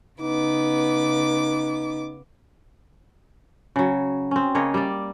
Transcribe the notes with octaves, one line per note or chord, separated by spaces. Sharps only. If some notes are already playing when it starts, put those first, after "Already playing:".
C#3 B3 D#4 D6
C#3 F#3
C4 C#4
C#3 A#3 C#5 D#5
G3 D5